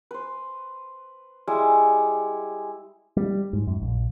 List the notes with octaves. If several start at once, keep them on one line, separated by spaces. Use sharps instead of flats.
B4 C5
G3 G#3 E4
G3
G#2
F#2
A#1